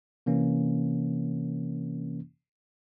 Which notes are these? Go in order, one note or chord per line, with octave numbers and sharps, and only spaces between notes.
C3 E3 A#3 C#4